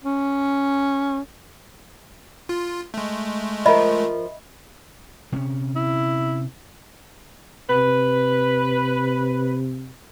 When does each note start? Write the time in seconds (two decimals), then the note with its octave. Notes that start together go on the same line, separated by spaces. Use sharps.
0.04 C#4
2.49 F4
2.94 G#3 A3
3.66 F3 A#4 D#5 E5 B5
5.32 C3 C4 C#4
5.76 E4
7.70 C3 B4